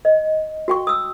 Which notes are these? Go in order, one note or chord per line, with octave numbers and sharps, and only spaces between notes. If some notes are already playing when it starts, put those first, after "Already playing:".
D#5
F#4 G5 C#6
D#6 E6